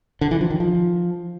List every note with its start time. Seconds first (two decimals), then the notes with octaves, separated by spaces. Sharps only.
0.21 D3
0.31 E3
0.41 F3
0.50 D#3
0.60 F3